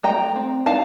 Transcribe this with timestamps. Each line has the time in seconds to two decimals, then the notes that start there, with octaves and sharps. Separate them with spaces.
0.03 A3 G5 A#5
0.36 C4
0.66 D#4 F5 A5